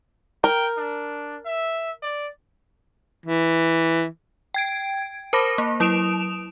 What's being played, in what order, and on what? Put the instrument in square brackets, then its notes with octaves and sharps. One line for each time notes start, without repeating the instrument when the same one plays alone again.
[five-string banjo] A#4 [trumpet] G5
[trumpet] D4
E5
D5
[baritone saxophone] E3
[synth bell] G5 G#6 D7
A#4 C5 A5 B5 D6 A#6
A#3
F#3 E4 D#6 D7 E7 F7